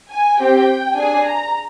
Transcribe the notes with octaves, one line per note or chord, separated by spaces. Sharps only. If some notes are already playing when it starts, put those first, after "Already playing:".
G#5
C4 G4 G5
D4 G#4 G#5
A#5